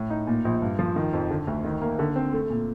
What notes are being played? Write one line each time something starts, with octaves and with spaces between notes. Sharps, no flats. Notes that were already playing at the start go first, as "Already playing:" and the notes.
Already playing: A2
D#4
A#2
A#1
G2
F3
D#3
F2
D3
D2
D#3
A#3
D3
C4
A3
A#2